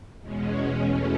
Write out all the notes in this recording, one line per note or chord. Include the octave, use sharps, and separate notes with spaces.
E2 B2 G#3 C#4
E2 B2 A3 C#4